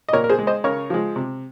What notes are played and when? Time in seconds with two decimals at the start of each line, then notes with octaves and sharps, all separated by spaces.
0.09 D#5
0.13 A#2 A#4 C#5
0.24 A#4
0.29 G#4 C5
0.39 G#3
0.47 C5 D#5
0.64 C#3 A#4 C#5
0.90 F3 G#3
1.16 C3